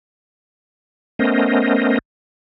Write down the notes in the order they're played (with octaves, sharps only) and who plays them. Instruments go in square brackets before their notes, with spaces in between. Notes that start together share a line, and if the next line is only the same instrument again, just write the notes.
[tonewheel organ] A3 B3 C#4 A#4 C5 D#5